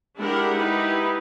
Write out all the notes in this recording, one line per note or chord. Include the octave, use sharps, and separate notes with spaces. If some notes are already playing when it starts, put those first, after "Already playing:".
G#3 D4 E4 G4 A#4 F#5
D#4 E4 G4 B4